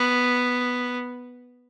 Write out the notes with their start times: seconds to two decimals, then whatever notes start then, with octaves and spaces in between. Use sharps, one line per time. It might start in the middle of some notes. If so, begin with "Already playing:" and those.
Already playing: B3